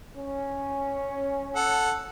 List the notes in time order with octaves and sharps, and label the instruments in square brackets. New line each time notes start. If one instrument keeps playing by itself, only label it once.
[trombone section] C#4
[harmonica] A4 F#5